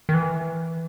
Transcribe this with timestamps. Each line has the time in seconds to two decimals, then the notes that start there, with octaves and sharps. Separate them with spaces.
0.09 D#3
0.14 E3